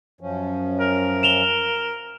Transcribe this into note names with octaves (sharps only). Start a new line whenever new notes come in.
F#2 F3 C#4
A#4
E7 F7 G7